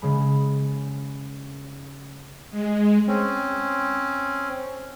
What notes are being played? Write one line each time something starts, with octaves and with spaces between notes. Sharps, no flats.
C#3 G#3 B5
G#3
C4 C#4